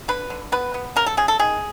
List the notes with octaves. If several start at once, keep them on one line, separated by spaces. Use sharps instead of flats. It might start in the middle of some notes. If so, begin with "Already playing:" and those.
D3 B4
D3
B3 B4
B3
C#3 A#4
A4
C#3 G#4
A4
D#3 G#4